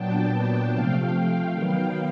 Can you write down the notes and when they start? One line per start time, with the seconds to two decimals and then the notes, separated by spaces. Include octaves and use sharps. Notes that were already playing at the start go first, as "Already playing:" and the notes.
Already playing: A#2 F#3 B3 D4 G5 A5
0.71 C3 F3 A3 F5 G5
1.51 D#3 F#3 B3